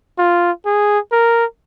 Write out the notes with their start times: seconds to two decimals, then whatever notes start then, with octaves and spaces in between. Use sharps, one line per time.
0.18 F4
0.65 G#4
1.12 A#4